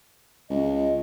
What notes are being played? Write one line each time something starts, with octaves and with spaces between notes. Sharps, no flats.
C#2 D#5